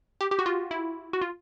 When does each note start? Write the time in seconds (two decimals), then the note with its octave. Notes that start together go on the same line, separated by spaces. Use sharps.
0.21 G4
0.31 G4
0.39 F#4
0.46 F4
0.71 E4
1.13 F#4
1.22 F4